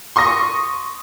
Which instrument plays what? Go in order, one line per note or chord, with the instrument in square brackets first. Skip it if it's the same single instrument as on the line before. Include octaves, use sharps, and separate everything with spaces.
[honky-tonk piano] C6 C#6 D#6 A#6